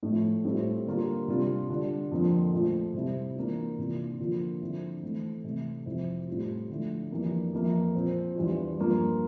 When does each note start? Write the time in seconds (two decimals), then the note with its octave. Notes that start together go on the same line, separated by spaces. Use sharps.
0.03 A2 F3 A3
0.44 A2 G3 C4 F4
0.87 D3 G3 A#3 F4
1.28 C3 G3 D4 F4
1.69 D3 G3 D4 F4
2.11 F2 D3 F3 A#3 F4
2.52 A#2 F3 A3
2.94 C3 G3 C4 E4
3.36 E3 A#3 D4 F4
3.78 C3 E3 A#3 D4 F4
4.20 D3 F3 A#3 F4
4.61 D3 F3 C4 E4
5.03 E3 A3 C4
5.44 C3 E3 A3 E4
5.86 F2 C3 F3 C4 E4
6.28 A2 G3 C4 F4
6.70 D3 F3 A3 E4
7.12 F2 E3 G3 A#3 D4
7.53 F2 E3 A#3 E4
7.94 A#2 F3 C4
8.35 E2 E3 G3 D4 F4
8.77 G2 F3 A#3 F4